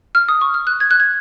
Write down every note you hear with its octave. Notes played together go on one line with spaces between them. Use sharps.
F6
D#6
C#6
F6
F#6
G#6
F#6
G#6